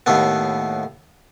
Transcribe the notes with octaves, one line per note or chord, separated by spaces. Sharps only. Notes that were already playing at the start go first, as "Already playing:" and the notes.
D#2 A2 A3 B3